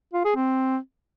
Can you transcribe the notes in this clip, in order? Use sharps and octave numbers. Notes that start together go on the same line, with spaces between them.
F4
G#4
C4